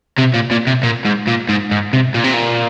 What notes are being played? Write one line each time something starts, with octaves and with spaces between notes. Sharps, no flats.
C3
A#2
A#2
C3
A#2
G#2
A#2
G#2
G#2
C3
A#2
C3
A#2